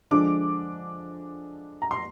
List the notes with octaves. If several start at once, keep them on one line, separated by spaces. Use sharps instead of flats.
D3 F3 G#3 D4 D6
A#5
C6